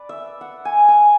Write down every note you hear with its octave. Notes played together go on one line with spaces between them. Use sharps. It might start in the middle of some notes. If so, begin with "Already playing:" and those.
Already playing: B4 D5
E5
F#5
G#5
G#5